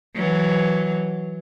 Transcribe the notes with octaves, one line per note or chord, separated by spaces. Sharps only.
E3 F#3